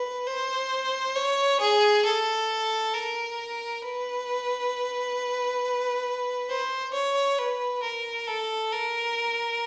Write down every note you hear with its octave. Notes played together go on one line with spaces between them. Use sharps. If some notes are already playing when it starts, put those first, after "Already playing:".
Already playing: B4
C5
C#5
G#4
A4
A#4
B4
C5
C#5
B4
A#4
A4
A#4